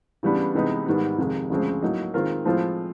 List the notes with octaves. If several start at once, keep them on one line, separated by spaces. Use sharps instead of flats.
C#3 E3 G3 B3 D4
C3 E3 G#3 B3 D#4
G#2 D#3 G3 B3
F2 C3 D#3 G#3
D2 C#3 F3 G#3 C4
A2 F#3 A#3 D#4
D#3 G#3 C4 F4 A#4
A2 F3 G#3 C4 F4